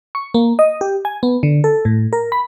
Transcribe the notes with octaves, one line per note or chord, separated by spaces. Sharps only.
C#6
A#3
D#5
G4
G#5
B3
D3
A4
A2
A#4
B5